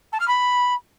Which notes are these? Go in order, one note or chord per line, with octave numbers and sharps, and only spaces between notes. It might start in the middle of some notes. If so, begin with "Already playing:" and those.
A5
F6
B5